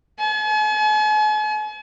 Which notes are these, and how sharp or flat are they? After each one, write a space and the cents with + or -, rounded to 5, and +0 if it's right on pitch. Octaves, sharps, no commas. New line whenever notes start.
G#5 +45